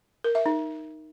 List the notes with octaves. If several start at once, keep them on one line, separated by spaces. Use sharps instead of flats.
A#4
E5
D#4